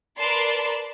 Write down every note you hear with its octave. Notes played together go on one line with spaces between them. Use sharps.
A#4 B4 D5 A5 C6